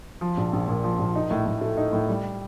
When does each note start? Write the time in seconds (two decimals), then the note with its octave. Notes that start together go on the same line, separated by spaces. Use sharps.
0.21 F3
0.37 A#1
0.53 A#1
0.68 A#2
0.84 F3
0.99 A#1
1.16 D#4
1.31 A2
1.46 A2
1.61 A3
1.77 D#4
1.93 A2
2.09 G3